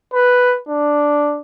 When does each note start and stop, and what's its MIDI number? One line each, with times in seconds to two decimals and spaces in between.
0.14 0.56 71
0.69 1.41 62